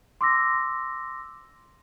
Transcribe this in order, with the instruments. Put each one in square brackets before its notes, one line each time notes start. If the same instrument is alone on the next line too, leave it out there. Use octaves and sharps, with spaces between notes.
[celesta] C6 D6 E6 A#6